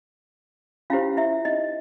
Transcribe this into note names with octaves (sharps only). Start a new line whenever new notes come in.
C#4 E4 F4 G4 C5 F5
E4 E5
D#4 D#5